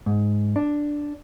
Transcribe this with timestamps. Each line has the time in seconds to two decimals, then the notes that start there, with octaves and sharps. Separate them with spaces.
0.06 G#2
0.56 D4